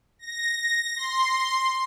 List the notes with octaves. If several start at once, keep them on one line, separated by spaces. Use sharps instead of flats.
A#6
C6